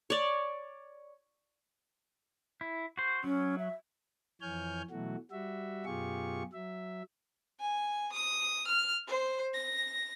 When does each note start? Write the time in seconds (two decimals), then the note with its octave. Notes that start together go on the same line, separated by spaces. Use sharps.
0.10 C#5 D5
2.61 E4
2.97 F#4 C5
3.24 F#3 C#4
3.59 E5
4.41 F2 E3 C#5 G#5 F6 G6
4.91 B2 E3 F#3 A3 F#4
5.31 G3 F#4 E5
5.85 F#2 B2 F4 G4 G#4 C#6
6.53 F#3 E5
7.60 G#5
8.12 D#6
8.67 F6
9.07 C5
9.54 A#6